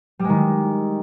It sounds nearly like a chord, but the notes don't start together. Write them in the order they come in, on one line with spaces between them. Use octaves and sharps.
G3 G#3 D#3